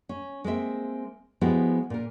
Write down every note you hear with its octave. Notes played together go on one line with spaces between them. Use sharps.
C#4
G#3 A#3 C4 E5
F3 G#3 B3 E4 F#4 G4
A#2 A#4